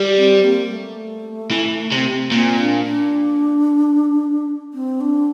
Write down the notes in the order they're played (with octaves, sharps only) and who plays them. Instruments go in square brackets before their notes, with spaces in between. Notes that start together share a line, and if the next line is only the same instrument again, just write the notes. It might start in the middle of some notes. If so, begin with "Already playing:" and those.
Already playing: [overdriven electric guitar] G3
[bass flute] C4
A#3
A3
[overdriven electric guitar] E3
C3
[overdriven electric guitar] A#2 [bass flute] C4
[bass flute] D4
D4
C4
D4